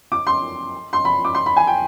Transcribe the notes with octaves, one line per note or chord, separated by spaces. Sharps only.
D6
C6
C6
B5
D6
C6
B5
G#5
G5